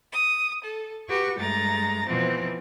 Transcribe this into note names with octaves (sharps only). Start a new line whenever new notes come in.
D#6
A4
F#4 G4 B4 C#6
G2 G#3 A3 A#5 A6
B2 E3 F3 C4